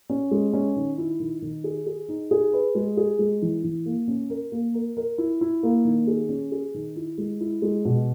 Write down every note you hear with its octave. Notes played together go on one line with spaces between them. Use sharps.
C#4
G#3
C#4
D#3
E4
D#3
D#3
G#4
G#4
D#4
G#4
B4
G#3
G#4
G#3
E3
E3
A#3
C#4
A#4
A#3
A#4
A#4
E4
E4
A#3
D#3
G#4
C#4
G#4
D#3
E4
G#3
E4
G#3
B2